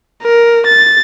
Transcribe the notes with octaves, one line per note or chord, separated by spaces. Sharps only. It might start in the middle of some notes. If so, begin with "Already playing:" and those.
A#4
A6